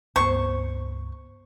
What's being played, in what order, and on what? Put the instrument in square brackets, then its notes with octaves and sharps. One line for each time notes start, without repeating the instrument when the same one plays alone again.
[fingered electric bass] C#2 G2 B3 [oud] C5 [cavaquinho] C#6